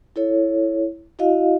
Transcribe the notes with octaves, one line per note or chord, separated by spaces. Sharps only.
E4 A4 C#5
E4 F#4 D#5 F5